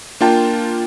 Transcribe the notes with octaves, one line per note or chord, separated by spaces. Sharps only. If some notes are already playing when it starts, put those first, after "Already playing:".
A#3 D4 F4 G5 A5